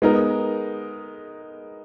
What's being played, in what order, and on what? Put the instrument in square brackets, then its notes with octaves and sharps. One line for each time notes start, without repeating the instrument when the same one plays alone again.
[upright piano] G#3 B3 D#4 A#4